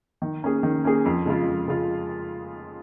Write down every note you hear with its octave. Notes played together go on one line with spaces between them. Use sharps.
D#3
A#3 C#4 G#4
D#3
A#3 C#4 G#4
F2
C#3 G#3 F4
F2
C#3 G#3 F4